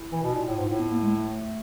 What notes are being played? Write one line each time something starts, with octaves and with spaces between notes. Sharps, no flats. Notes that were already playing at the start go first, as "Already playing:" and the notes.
Already playing: E4
E3
B2
D#4
A#2 E4
A2 F4
G#2
A2
B3
A#3
G#3
A3